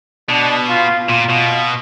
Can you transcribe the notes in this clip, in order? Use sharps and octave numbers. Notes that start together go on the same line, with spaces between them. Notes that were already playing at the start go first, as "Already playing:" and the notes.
B2 D4
F4
A#2 F4
B2